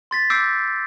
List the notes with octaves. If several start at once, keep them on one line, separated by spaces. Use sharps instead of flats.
C6 A6 B6
D6 E6 G6 A#6 C7 D7